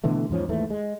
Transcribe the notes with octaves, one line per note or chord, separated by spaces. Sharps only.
B2 D3 E3 A3
E2 G#2 F3 C#4
D#2 G#2 E3 A3
G#3